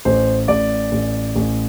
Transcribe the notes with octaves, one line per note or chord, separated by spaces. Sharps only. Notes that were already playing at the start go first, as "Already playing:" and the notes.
A1 C5
A1 D5
A1
A1